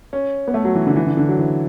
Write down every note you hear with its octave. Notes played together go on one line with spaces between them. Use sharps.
C#4
B3
A3
F#3
E3
D3
E3
D3
D3
F#3
E3